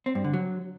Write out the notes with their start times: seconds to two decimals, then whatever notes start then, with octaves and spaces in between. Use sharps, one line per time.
0.06 C4
0.15 G2
0.24 D3
0.33 F#3